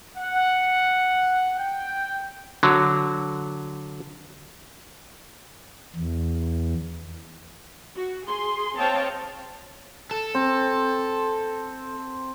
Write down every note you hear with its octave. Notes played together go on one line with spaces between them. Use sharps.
F#5
G5
D3 F#3
E2
F#4
G#4 C6
C4 C#5 D#5 F5 G5 A5
A4
C4